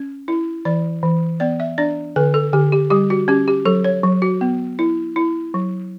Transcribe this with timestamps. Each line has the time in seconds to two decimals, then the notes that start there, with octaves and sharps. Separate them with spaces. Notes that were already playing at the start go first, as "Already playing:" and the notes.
Already playing: C#4
0.28 E4
0.65 E3 D5
1.03 E3
1.40 B3 D5
1.60 E5
1.78 D4 D5
2.16 D3 B4
2.34 A4
2.53 D3 G4
2.72 G4
2.90 G3 G4
3.10 F#4
3.28 C#4 G4
3.48 G4
3.66 F#3 A4
3.84 C#5
4.04 F#3
4.22 F#4
4.41 B3
4.79 E4
5.16 E4
5.54 F#3